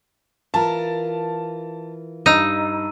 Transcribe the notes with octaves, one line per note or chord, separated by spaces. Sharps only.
E3 F4 A#4 A5
G2 D#4 A#5 E6 D#7